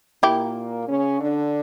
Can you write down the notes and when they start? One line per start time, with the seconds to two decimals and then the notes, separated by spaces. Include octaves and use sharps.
0.23 A#2 A#3 E4 G4
0.88 C#3 C#4
1.21 D3 D4